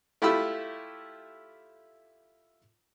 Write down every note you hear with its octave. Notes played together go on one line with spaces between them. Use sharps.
A3 E4 F4 G4 B5 E6